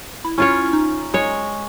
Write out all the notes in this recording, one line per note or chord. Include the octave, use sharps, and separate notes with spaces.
E4
C#4 E4 F4 C#5
D#4
G#3 C#5